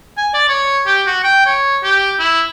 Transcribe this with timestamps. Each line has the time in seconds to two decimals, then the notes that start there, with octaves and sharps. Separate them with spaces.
0.17 G#5
0.34 D5
0.49 C#5
0.87 G4
1.06 F#4
1.24 G5
1.46 C#5
1.84 G4
2.19 E4